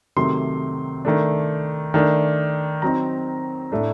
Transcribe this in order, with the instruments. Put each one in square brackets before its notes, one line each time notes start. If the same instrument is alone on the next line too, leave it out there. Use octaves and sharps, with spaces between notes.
[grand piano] C3 D#3 F#3 A3 C6
D#3 A3 D4
D#3 A3 D4
F#3 C4 D#4 A#5
A2 A3 D4